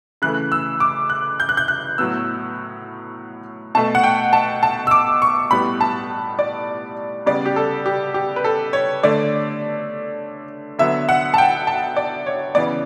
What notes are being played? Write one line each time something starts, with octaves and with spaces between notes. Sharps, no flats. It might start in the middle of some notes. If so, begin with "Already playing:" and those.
C#3 E3 A3 F#6
E6
D6
F#6
G6
F#6
G6
F#6
A2 F#3 B3 E6
B2 A3 A5
F#5
G5
A5
A5
E6
D6
C#6
A2 G3 B3 B5
A5
D5
C#3 G3 B3 D5
G4
A4
G4
G4
B4
A4
C#5
D3 A3 D5
D3 F#3 B3 E5
F#5
A5
G5
A5
D5
C#5
C#3 E3 B3 D5